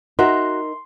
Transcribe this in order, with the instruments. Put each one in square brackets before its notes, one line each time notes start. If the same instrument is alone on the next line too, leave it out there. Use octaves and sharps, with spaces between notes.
[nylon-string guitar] D#4 A#4 E5 [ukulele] F#4 [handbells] C6